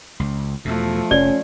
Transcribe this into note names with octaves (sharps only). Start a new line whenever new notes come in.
C#2
E2 B2 F3 A3
F1 C#4 D5